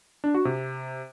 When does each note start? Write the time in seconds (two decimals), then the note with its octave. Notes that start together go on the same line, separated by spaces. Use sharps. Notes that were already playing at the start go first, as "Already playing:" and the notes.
0.24 D4
0.34 F#4
0.45 C3